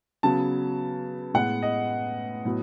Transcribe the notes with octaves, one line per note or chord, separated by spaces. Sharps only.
C#3 F#3 B3 A5
A2 G#3 B3 F#5
D#5
A2 F#3 B3